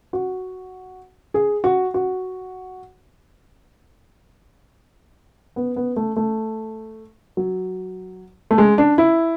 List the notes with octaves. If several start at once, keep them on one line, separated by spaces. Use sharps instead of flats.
F#4
G#4
F#4
F#4
B3
B3
A3
A3
F#3
A3
G#3
D4
E4